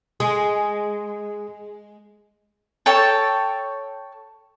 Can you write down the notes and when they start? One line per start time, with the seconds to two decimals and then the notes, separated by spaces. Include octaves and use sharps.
0.20 G#3 G#4
2.86 A4 C#5 G5 A5